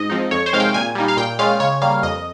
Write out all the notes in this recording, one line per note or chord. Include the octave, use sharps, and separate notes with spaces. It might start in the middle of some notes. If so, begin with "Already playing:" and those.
Already playing: G#2 D#5
F3 C4 D#4
F2 C#5
C5
C3 D#3 G#3 F5
G5
A#2 G#5
G3 A#3 D#4
F5
A#2 G5
G#3 C#4 F4 F5
C#3 C#5
G3 A#3 F5
F2 D#5